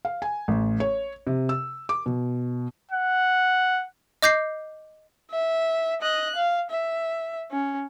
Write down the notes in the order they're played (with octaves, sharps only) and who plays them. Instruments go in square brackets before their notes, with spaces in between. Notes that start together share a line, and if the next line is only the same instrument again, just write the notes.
[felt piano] F5
G#5
A1
C#5
C3
E6
D6
B2
[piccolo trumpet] F#5
[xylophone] D#5 D6 G6 A#6 C7
[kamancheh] E5
D#5 F#6
F5
E5
C#4